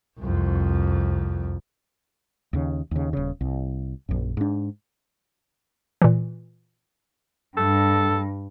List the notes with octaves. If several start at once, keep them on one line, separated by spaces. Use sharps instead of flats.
C2 F2
D#2 C#3
D#2 C#3
D#1 C#3
C2
A#1 F#2
G#2 D4
A#2 E3
G2 A4